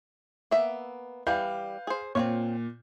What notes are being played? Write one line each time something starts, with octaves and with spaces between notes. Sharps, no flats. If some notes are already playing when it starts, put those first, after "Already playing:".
A#3 B3 E5
E3 G3 B4 F5 G6
G#4 C5
A#2 C4 F4 C#5